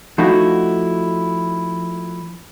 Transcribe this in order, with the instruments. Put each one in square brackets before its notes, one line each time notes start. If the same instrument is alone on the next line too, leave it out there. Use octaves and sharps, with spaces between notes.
[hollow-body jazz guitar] F3 A3 D#4 E4 F#4